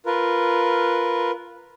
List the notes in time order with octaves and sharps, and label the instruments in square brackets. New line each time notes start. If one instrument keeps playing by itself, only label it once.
[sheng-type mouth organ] F4 A#4 B4